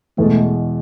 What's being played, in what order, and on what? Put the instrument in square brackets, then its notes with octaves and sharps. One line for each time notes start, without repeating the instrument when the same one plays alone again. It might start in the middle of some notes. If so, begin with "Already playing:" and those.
[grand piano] E2 B2 G#3 [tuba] A3